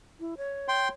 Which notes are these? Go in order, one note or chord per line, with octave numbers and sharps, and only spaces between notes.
E4
C#5
G5 C6